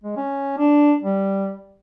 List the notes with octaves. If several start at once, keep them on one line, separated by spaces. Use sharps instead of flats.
G#3
C#4
D4
G3